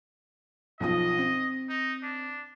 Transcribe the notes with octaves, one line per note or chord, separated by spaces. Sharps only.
B1 F3 D#5 D#6
C4
D#4
D4